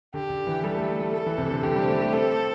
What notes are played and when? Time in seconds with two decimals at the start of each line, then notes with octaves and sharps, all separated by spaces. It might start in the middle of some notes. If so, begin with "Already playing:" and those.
0.14 D3 G4
0.30 D3
0.47 E3
0.63 G3 A4
0.76 A3
0.88 A3
1.01 A3
1.13 A3 A4
1.26 E3
1.38 C3
1.50 D3
1.63 D3 G4
1.76 G3
1.83 C4
1.88 A3
2.01 A3
2.13 C4 A4